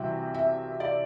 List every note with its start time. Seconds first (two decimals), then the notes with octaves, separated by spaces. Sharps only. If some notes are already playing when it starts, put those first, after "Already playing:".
Already playing: C2 C3 E3 G3 F#4 E5
0.34 E5
0.80 D5